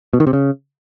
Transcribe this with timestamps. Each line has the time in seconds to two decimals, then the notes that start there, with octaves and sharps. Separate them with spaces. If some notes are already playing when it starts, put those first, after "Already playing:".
0.13 B2
0.20 D#3
0.27 C3
0.33 C#3